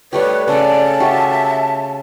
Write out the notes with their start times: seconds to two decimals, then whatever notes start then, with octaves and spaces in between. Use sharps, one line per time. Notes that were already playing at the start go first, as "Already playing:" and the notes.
0.13 G3 A3 G4 B4 C#5
0.48 C#3 A4 D5 A5
1.00 F#4 G4 E5